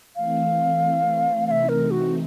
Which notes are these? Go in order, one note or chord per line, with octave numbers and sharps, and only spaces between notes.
E3 A3 C4 F5
C3 E3 A3 C4 D#4 E5 F5
A#4
F#4